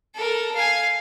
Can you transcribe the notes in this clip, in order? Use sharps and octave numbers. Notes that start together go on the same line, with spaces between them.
A4 A#4
F5 G#5